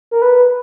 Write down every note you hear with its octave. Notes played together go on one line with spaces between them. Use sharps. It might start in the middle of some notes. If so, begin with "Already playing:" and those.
A#4
B4